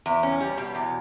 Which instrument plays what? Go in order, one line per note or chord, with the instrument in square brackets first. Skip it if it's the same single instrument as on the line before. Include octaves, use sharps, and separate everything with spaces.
[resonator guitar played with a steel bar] E2
C#4
G3
B2
E2